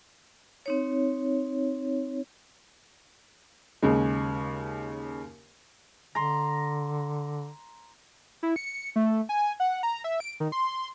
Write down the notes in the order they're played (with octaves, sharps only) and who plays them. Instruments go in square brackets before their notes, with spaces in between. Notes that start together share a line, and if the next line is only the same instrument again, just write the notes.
[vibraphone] C4 D#4 C#5
[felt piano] D#2 C#3 G#3
[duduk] D3 [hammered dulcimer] A#5 C6
[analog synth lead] E4
C#7
A3
G#5
F#5
A#5
E5
D7
D#3
C6